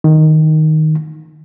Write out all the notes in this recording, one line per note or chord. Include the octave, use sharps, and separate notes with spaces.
D#3